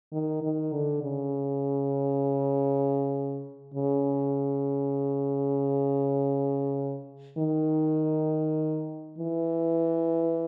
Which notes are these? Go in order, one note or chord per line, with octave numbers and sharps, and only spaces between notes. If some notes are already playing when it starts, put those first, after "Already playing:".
D#3
D#3
D3
C#3
C#3
D#3
E3